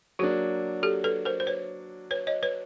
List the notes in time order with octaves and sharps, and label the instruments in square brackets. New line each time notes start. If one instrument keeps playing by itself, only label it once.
[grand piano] F#3 A#3 D4 [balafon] F#4 G#4
[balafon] G4 A4
A4 B4
A#4 C5
C5
B4 C#5
B4 C#5
C#5 D#5
B4 C#5